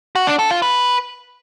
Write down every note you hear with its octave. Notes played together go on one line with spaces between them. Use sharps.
F#4
D4
A4
F4
B4